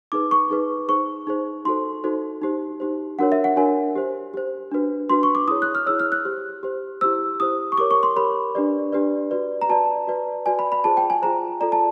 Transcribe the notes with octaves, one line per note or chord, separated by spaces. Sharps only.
D#4 G#4 B4 D6
C#6
D#4 G#4 B4
D#4 G#4 C5 C#6
D#4 G#4 C5
D#4 F#4 A4 C5 C6
D#4 F#4 A4 C5
D#4 G4 C5
D#4 G4 C5
D4 F#4 A#4 C#5 F#5
E5
F#5
D4 F#4 A#4 C#5 G#5
G4 C5
G4 C5
D4 F#4 B4
D4 F#4 B4 C6
C#6
D6
E4 G#4 C#5 D#6
F#6
F6
E4 G#4 C#5 E6
F6
F#6
G4 C5
G4 C5
E4 G4 C5 E6
E4 G4 C5 D#6
C#6
G4 A#4 C#5 D6
C#6
C6
G4 A#4 C#5 B5
D4 G4 B4 D5
D4 G4 B4 D5
F#4 B4 D5
A#5
F#4 B4 D5 A5
F#4 B4 D5
F#4 B4 D5 G#5
B5
B5
F4 G#4 C5 A5
G5
G#5
F4 G#4 C5 A#5
F4 A4 D5 A#5
A5